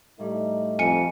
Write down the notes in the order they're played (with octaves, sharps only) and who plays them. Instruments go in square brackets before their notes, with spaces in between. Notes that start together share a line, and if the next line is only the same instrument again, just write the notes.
[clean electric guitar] A2 G3 [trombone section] A3 D#4
[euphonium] F2 [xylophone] G#5 C#7